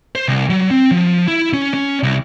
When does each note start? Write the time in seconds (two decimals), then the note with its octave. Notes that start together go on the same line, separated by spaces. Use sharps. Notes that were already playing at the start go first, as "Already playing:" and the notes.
0.15 C5
0.28 C2
0.50 F#3
0.71 C4
0.91 F3
1.28 E4
1.54 C#4
1.74 C#4
2.03 C2